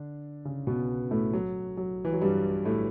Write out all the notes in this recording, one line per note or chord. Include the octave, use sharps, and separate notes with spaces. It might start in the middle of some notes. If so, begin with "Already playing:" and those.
Already playing: D3 D4
C#3 C#4
B2 B3
A2 A3
F#3
F#3
E3
F#3
G2 G3
A2 A3